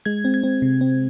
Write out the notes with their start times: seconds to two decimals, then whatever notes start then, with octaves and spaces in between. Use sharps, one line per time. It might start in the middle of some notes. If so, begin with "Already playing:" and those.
0.05 G#3 G#6
0.25 C4
0.34 G#6
0.43 C4
0.62 C3
0.81 C4